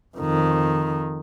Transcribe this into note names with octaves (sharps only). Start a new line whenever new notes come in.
F2 D#3